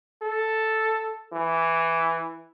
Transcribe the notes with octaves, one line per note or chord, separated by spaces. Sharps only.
A4
E3